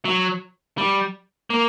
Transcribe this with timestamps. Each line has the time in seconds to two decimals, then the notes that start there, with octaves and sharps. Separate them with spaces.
0.05 F#3
0.78 G3
1.50 A#3